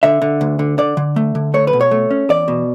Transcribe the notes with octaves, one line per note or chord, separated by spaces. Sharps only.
D3 E5
D3
D2
D3
D3 D5
D3
A3
D3
A3 C#5
B4
B2
C#5
A3
C#4
E2 D5
B2